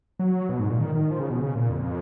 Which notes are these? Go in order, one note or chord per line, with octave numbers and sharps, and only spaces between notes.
F#3
B2
G#2
A#2
D#3
D#3
F3
C#3
B2
C#3
A#2
F2